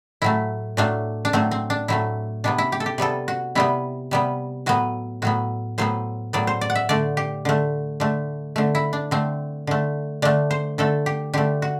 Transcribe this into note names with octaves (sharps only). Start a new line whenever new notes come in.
A2 F#3 A3 E4
A2 F#3 A3 D4
D4
A2 F#3 A3 C4
C4
D4
A2 F#3 A3 E4
C3 G3 B3 D4
E4
G4
A4
G4
C3 G3 B3 A4
F#4
C3 G3 B3 E4
C3 G3 B3
A2 F#3 B3 F#4
A2 F#3 B3 F#4
A2 F#3 B3 C5
A2 F#3 B3 D5
C5
D5
F#5
E5
D3 A3 D5
G4
D3 A3
D3 A3
D3 A3
E4
D4
D3 A3 C4
D3 A3
D3 A3 D4
C5
D3 A3 A4
G4
D3 A3 G4
F#4